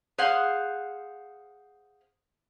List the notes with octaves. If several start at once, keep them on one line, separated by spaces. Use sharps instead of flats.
G#4 C5 F5 F#5